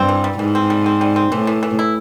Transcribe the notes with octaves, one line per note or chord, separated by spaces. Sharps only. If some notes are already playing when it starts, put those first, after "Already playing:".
Already playing: G2 C4
E3
G3
G#2 E3
C4
G3
C4
G3
C4
A2 E3
E3
E3
E4